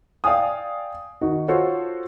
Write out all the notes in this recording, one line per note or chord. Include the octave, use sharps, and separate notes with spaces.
D5 F5 G5 G#5 D#6
D#3 D#4 F#4
F4 F#4 A4 C5 C#5